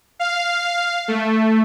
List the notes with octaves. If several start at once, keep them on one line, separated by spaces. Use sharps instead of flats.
F5
A3